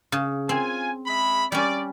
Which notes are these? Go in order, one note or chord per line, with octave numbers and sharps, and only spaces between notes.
C#3
C4 F4 G#5
G#3 E5 B5
G3 C#4 D5